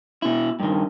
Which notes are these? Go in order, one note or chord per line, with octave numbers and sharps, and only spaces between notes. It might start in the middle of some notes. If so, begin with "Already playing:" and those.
B2 E4
G2 D#3